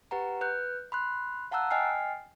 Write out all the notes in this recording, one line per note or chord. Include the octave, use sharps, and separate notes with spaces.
G4 B4 F#5 A#5
B4 F#6 G6
B5 C6 F#6
F5 F#5 A5 A#5 E6 F#6
D#5 G5 G#5 F6 C7